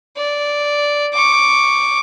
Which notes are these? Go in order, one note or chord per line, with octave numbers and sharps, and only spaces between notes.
D5
C#6 D6